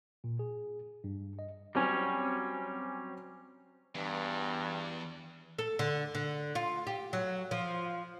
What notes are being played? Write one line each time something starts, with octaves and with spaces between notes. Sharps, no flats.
A#2
G#4
G2
D#5
F#3 G3 C4 C#4 G#5
E2 G2
A4
D3
D3
F4
G4
F#3
F3